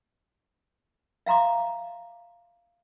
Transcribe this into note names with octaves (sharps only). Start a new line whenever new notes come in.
E5 F5 A#5 C6 D6